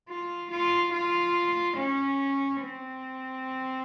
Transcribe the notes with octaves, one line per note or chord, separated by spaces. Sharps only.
F4
F4
F4
C#4
C4